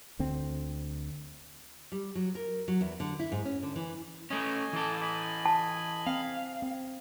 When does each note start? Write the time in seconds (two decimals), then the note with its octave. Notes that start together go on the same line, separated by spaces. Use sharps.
0.19 D2 D3 C4
1.92 G3
2.15 F#3
2.35 A#4
2.68 F#3
2.81 E2
3.00 D3
3.19 E4
3.32 G#2
3.45 C#4
3.63 D3
3.76 E3
4.30 A3 C#4 D#5 G#5
4.73 E3 A4
5.01 D#5 G#5 B5
5.46 A5
6.07 C4 F5
6.62 C4